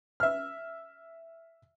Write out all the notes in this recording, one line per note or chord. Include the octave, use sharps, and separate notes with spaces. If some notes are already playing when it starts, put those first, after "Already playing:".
E5 F6